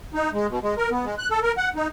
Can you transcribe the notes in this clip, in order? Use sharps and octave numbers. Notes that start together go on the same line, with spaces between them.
D#4
G#3
B2
G#3
A#4
B3
G#3
F#6
A4
A#4
F#5
D#4